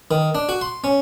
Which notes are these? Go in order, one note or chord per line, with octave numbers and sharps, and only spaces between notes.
D#3
D4
F#4
C6
C#4